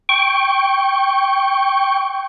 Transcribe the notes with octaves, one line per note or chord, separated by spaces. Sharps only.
G5 C#6